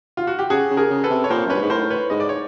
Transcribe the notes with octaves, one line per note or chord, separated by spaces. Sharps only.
F4
F#4
G4
C#3 F#4 G#4
C#3
G#4 A#4
C#3
A4 B4
C3
C#5
A#2 A#4 C5
F#2
G2 B4 C#5
G#2 B4
A2 A#4 C5
B4 C#5
G#2 D#5
D5
C#5